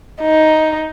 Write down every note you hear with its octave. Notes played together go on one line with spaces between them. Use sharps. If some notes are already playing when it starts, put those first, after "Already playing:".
D#4